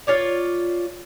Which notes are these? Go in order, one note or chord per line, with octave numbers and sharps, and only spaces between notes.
F4 C#5 D5